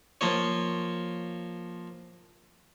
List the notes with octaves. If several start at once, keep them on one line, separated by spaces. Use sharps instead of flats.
F3 A#3 F4 C#5